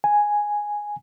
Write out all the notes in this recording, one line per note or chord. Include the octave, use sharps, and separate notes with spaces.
G#5